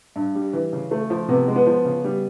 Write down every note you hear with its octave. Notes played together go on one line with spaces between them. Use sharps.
G2
G3
E3
C#3
A3
F3
C3 B3
G#3
B3
F3
C#3
G3